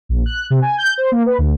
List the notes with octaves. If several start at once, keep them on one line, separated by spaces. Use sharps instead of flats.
A#1
F#6
C3
G#5
G6
C5
A#3
B4
D2